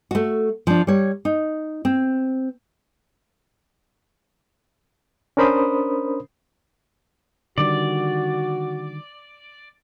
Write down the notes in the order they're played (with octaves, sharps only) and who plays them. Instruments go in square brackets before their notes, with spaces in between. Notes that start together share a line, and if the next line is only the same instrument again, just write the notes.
[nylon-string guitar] A3 F#4
F3 D4
G3 C#5
D#4
C4
[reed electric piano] C#4 D4 A#4 C5 B5 D#6
[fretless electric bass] D3 D#3 G3 [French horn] F#4 [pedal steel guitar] D5